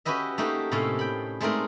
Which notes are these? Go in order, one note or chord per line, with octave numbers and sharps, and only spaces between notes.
C#4 F#4 G4 B4 D#5 E5
A3 A#3 D#4 F#4 G4 A4
A2 C3 A#3 C#4 A4 F5
G5 B5
G#3 A3 C4 D#4 A#4 D5